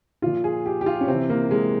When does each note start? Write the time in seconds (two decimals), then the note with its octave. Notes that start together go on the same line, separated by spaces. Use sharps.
0.22 A#2 F3 F4
0.44 G#4
0.66 G4
0.81 G4
0.86 F4
1.01 C#4
1.08 C3 E3 C4
1.30 A#3
1.51 G#3